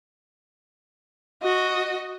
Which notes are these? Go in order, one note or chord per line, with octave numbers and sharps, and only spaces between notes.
F#4 D#5